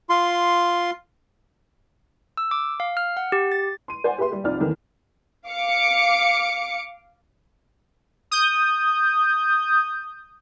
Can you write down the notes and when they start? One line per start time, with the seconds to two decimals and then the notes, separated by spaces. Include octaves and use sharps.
0.09 F4 C6
2.37 E6
2.51 D6
2.80 F5
2.97 F6
3.17 F#5
3.32 G4
3.52 A6
3.88 C6 D#7
4.04 C5 D5 F#5 G#5
4.18 G4 G#4 B4 E5 C6
4.32 G3 G4
4.44 C2 F3 D#4 D5 F6
4.60 D#2 D#3 E3 A3
5.47 F5 D6 C#7
8.31 D#6 G6